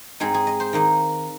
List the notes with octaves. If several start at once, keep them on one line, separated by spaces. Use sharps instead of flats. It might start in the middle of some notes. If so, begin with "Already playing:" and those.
G#2 G#3 C4 D#4 G#4
G#4
D#5
C5
D#3 A#3 D#4